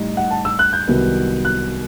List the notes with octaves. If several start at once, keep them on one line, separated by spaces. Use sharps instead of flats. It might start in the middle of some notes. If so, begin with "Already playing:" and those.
Already playing: A2 G3 D#4
F#5
A5
E6
F#6
G6
C2 C3 D#3 F#3 B3
F#6